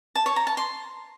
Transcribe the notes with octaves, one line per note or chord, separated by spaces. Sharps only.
A5
C#5
A#5
A5
C6